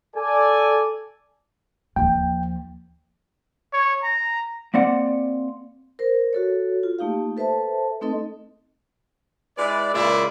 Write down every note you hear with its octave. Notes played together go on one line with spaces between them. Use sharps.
A4 D5 G#5
D#2 F3 G5
C#5
A#5
A#3 C4 D5 F#5
A#4 C5
F#4 A4 C#5
F4
A3 A#3 D#4 G4 F5
A4 B4 C5 E5 A5
A3 C4 D#4 A4 D#5
G#3 E4 B4 D5
A#2 C#3 G#3 A#3 E4 D5